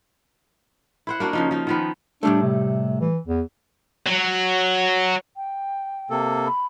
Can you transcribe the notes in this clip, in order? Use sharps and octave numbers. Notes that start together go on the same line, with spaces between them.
E4 C5 F#5
A#3 D4 F#4
C#3 F3 D#4
F3 D#4
D#3 F3 B3
A2 G3 A3 D4
C3
E3
E2
F#3
G5
C3 A#3 A4
B5